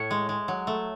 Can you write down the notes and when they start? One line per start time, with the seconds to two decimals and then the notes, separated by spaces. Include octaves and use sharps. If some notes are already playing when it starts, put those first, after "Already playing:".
Already playing: A2 C#5
0.11 G#3
0.29 G#3
0.48 F#3
0.67 A3